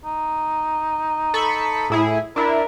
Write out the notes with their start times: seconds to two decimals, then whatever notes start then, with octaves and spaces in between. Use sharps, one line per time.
0.04 D#4
1.34 A4 B5 C#6
1.90 A2 E4 G#4
2.36 D4 E4 A#4